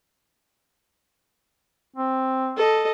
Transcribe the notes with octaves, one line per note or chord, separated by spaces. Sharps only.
C4
A4 D#5